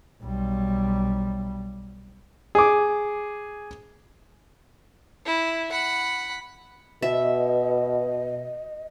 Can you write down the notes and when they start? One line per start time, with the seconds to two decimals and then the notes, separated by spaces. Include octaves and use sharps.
0.23 B1 G3
2.55 G#4 D6
5.26 E4
5.71 F#5 B5
7.02 B2 D#5 E5